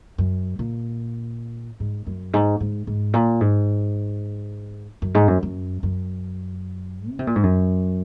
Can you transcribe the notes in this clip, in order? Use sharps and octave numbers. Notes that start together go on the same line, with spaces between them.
F#2
A#2
G#2
F#2
G#2
G#2
G#2
A#2
G#2
F#2
G#2
F#2
F#2
F#2
C#3
C3
A#2
G#2
F#2